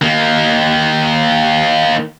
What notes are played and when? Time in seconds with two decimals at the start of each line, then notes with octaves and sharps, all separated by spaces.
0.02 D#3 A#3